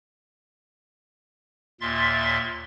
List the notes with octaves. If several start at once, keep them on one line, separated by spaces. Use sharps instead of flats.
D#2 A#2 E5 C6 A6